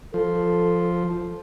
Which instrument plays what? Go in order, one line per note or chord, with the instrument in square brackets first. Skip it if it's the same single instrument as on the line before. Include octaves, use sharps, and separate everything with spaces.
[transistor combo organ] F3 [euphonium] A4